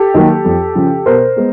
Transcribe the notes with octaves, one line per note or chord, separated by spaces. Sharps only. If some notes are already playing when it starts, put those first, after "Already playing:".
Already playing: G4 A4
D#3 F#3 A#3
F2
C#3 F3
B2 A#4 C5
G#3 B3